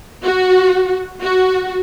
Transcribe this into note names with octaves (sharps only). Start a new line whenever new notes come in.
F#4
F#4